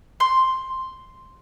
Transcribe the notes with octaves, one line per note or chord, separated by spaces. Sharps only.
C6